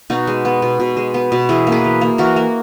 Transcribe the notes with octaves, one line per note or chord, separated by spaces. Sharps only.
B2 D#4 F#4
G#3
B3
B2
B2
G#3
B3
B2
E3 E4 G#4
A#3
G#4 B4
E3
A#3
E3 F#4 A#4
A#3